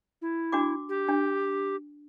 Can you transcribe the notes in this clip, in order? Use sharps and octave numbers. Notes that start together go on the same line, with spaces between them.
E4
D4 F#4 D6
G4
D4